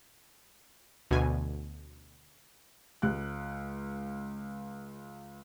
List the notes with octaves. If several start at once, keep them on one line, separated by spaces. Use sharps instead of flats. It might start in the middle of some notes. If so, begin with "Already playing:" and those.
D2 B2 G#5
C#2 F#6